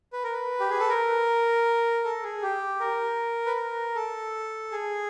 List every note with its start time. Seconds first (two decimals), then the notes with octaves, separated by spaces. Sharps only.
0.13 B4
0.24 A#4
0.33 B4
0.60 G4
0.69 G#4
0.80 A4
0.90 A#4
2.04 A4
2.23 G#4
2.43 G4
2.80 A#4
3.46 B4
3.57 A#4
3.95 A4
4.72 G#4